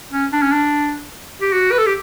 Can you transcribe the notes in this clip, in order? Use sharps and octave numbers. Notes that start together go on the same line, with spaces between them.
C#4
D4
C#4
D4
G4
F#4
B4
A4
G4